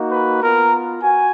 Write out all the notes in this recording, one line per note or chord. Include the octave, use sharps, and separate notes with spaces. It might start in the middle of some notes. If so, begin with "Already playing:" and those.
Already playing: A#3 D#4 F#4
B4
B3 F4 A#4
F#4 G#5